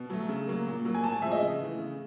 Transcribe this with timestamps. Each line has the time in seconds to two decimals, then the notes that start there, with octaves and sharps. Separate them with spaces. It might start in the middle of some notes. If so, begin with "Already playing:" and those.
Already playing: B2
0.10 F#3 A3
0.29 C#3
0.47 F#3 A#3
0.66 A#2
0.85 F#3 A#3
0.94 G#5
1.04 A2 A5
1.12 G#5
1.22 F3 G#3 C4 E5
1.32 D#5
1.41 C#3
1.59 E3 A3
1.78 C#3